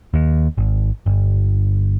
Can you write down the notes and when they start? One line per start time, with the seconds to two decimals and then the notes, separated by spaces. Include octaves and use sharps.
0.14 D#2
0.58 G#1
1.06 G1